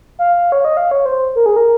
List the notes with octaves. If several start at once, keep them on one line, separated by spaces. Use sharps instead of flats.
F5
C#5
D#5
F5
C#5
C5
A#4
G#4
A#4